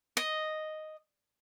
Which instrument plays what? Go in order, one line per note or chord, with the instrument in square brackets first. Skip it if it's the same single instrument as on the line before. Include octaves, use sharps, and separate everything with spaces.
[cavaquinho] D#5